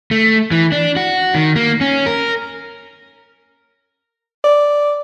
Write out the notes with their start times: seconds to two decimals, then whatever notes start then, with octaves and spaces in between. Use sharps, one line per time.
0.11 A3
0.51 E3
0.72 D4
0.96 F#4
1.35 D#3
1.56 A#3
1.81 C#4
2.06 A#4
4.44 D5